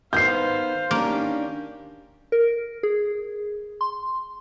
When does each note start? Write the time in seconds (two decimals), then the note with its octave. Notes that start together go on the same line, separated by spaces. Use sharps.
0.13 D#3 B3 C5 F5 G6 C7
0.91 D#3 A#3 C#4 D4 G4
2.32 A#4
2.83 G#4
3.81 C6